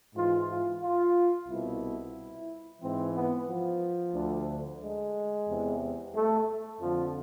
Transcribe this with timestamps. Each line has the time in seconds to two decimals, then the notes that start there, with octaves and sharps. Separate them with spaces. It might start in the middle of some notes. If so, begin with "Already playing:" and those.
0.16 G#2 E3 F4
0.50 F4
0.83 F4
1.49 C2 B2 E4
2.82 G#2 E3 C4
3.15 B3
3.49 F3
4.15 D2 D3
4.82 G#3
5.48 E2 C3 E3
6.14 A3
6.81 F2 D3 F3